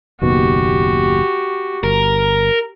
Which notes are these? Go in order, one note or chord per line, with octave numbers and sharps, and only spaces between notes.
F#1 D#2 B2 F#4 G4
G1 A#4